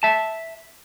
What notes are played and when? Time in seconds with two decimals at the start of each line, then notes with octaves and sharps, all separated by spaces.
0.03 E5 A5